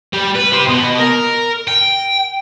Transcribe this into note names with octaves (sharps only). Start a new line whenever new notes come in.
G3
B4
G4 C5
B2 D#5
A#4
G5